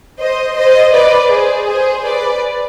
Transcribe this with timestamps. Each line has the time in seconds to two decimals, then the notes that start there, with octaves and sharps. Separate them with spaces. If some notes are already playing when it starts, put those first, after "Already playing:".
0.19 C5 D#5
0.56 C5 D#5
0.94 B4 D5
1.30 G#4 C5
1.68 G#4 C5
2.05 B4 D5